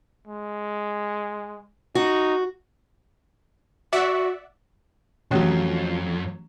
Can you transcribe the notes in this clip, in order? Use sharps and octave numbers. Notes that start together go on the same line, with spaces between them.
G#3
D#4 F#4
F#4 D5 E5 F#5
B1 F2 E3 F#3 A3 C#4 G4